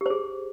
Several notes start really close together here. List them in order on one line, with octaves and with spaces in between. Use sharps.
G4 C5 G#4